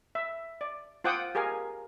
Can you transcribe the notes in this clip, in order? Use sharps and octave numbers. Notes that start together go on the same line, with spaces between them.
E5
D5
F4 C5 F#5 G5 D6 D#6
G4 G#4 A#4 F5 G#5